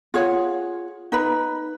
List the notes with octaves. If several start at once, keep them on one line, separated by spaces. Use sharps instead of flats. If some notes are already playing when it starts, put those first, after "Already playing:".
F4 G#4 C#5 F#5
D#4 B4 B5